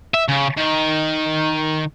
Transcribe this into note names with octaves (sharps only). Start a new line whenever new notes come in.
E5
C#3
D#3